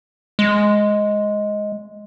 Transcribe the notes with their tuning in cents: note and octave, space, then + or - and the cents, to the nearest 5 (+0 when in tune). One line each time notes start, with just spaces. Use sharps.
G#3 +5